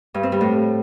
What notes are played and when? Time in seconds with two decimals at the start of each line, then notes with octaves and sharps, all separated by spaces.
0.14 G2
0.23 C4
0.32 G3
0.41 A2